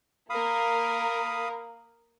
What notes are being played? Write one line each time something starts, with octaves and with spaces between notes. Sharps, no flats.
A#3 A#4 F5 B5 D#6